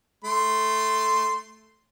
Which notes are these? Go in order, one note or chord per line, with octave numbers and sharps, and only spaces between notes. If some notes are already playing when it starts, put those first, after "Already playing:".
A3 C6